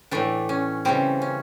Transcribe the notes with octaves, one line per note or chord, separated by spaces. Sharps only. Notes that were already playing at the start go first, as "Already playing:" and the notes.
A2 E3 A3 D4
C#4
C#3 E3 G3 C4
C#4